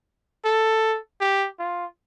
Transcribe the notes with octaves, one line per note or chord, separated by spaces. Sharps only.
A4
G4
F4